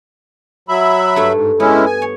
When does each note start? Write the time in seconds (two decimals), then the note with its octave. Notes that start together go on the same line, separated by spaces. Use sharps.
0.69 F#3 E5 B5
1.16 G2 A3
1.34 G#2
1.60 G#3 B3 C#4 E4
1.85 G#5
2.02 C#5